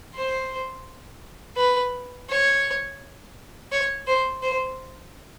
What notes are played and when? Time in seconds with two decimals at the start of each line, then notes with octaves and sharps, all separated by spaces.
0.14 C5
1.57 B4
2.29 C#5
3.72 C#5
4.07 C5
4.42 C5